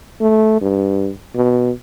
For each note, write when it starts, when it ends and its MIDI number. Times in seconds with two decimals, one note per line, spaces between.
0.21 0.59 57
0.61 1.10 43
1.35 1.71 47